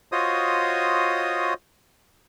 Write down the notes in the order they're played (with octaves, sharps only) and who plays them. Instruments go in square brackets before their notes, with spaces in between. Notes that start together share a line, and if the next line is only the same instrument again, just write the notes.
[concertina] F4 F#4 C5 C#5 D#5 D#6